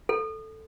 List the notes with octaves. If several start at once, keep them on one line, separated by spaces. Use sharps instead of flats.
A4